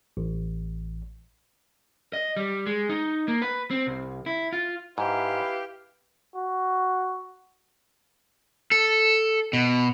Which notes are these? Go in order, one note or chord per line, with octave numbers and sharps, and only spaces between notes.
A1
D#5
G3
G#3
D#4
A#3
B4
C4
C2
E4
F4
G#2 E4 G4 B4 F5
F#4
A4
B2